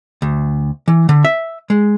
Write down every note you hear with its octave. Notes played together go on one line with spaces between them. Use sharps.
D2
E3
D3
E5
G#3